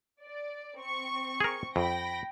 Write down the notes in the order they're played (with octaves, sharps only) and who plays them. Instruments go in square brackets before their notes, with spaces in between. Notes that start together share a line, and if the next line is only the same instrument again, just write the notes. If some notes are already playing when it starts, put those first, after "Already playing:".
[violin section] D5
C4 C#6
[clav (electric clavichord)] G#4 A#4
[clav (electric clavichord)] F2 [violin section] G5 B5 A#6